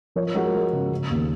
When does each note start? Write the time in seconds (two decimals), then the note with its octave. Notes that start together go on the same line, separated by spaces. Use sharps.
0.16 F3 A#4 C#5
0.34 G#3 F#4 A#4
0.53 G#3
0.73 C#3
0.92 C#3
1.10 D#2